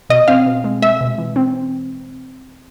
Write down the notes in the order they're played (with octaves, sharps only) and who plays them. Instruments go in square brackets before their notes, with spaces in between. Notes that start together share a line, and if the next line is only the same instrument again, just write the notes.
[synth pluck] B2 [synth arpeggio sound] D#5
[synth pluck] C4 [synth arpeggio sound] F5
[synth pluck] B2
G#3
[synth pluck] G#3 [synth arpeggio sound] E5
[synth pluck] B2
E3
C4